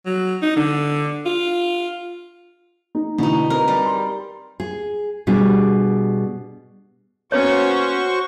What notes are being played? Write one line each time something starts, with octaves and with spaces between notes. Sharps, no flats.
F#3
D#4
D3
F4
D#4
B2 D3 D#4 E4
C4 A#4 B4
G3
C6
G#4
B2 G3 D4 G#4
A#3 B3 C#4 F#4 C5 C#5 C#6